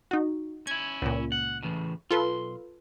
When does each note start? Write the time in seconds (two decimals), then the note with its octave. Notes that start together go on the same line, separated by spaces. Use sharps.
0.11 D#4 F#4
0.67 C#4 E4 G#6
1.02 C#2 A#2
1.32 F#5
1.63 A2 C#3 E3
2.11 B1 F4 A4 B4 C6